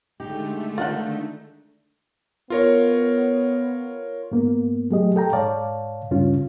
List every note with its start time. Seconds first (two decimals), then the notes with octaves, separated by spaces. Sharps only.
0.20 D3 G#3 A3 D#4 G4
0.78 D#3 D4 D#4 F4 F#5
2.50 B3 F4 A#4 C#5
4.32 G#2 A#3 B3
4.91 F#3 A3 G4 G#4 D#5
5.16 A4 G5 A#5
5.33 G#2 C#5 D5 F5 A5
6.11 D2 G2 C#3 C#4 F4